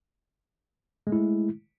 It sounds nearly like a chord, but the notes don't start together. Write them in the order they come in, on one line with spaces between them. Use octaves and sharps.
G#3 A3 E4